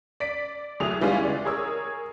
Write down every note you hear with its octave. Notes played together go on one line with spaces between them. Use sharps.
D5 B6 D7
C2 F#3 A3 G#4 F7
E3 G3 G#3 C#4 F4
C#2 D5
G#4 A#4 C#5 E6